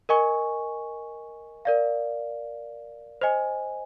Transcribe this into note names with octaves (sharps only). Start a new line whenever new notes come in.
A#4 D#5 G#5 C#6
A#4 D5 F5
C5 D#5 G#5